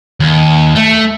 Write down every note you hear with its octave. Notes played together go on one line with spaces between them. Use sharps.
D#2
A3